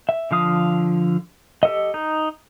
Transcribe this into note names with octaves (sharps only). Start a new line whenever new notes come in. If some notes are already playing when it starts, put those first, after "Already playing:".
E5
D3 F3 F5 D#6
G4 A4 D#5
D#4